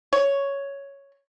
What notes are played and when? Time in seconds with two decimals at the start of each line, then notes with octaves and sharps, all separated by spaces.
0.13 C#5